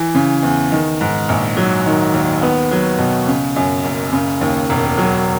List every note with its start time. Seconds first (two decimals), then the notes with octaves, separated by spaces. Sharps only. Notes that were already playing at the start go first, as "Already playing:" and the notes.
Already playing: E3
0.15 C#3
0.43 E2
0.72 D#3
1.01 G#2
1.29 A#1
1.57 F#3
1.86 D#3
2.13 D#2
2.42 B3
2.71 F#3
2.99 B2
3.27 C#3
3.56 F#2
3.84 F#1
4.13 C#3
4.41 D#2
4.70 E1
4.98 F#3